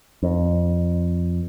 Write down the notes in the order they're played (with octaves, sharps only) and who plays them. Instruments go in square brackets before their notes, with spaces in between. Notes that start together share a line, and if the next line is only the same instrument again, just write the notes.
[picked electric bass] F2